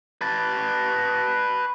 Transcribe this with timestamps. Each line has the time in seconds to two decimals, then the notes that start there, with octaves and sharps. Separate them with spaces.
0.21 B4 A5